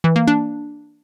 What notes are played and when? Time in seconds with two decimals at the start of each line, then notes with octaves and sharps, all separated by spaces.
0.04 E3
0.16 A#3
0.28 D4